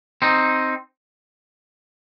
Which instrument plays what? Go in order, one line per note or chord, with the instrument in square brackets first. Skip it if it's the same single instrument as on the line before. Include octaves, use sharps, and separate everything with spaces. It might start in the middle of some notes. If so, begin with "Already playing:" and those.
[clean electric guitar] C4 D#4